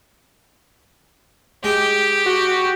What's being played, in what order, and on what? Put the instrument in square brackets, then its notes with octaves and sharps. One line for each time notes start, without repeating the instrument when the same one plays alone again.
[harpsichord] G#3 [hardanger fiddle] G4
[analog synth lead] F#4